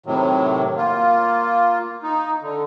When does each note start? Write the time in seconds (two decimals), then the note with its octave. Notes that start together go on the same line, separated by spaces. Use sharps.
0.06 A2 C3 D#3 F#3
0.77 A#3 F4
2.03 D#4
2.42 D3